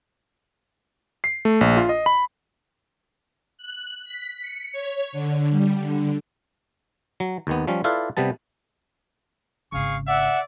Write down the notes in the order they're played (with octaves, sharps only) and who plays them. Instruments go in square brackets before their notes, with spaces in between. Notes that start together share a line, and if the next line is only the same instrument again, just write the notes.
[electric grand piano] C7
A3
A#1
F4
D#5
B5
[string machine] F#6
B6
C#7
C#5
D3
G3
D3
[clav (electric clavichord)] F#3
D#2 D#3 B3
F3 G3 C#4
E4 F4 A4 B4 D5 F5
C3 G3 B3 A5
[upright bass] G#1 C#3 [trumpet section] G#4 F5 C#6
[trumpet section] D5 E5 [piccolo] F#5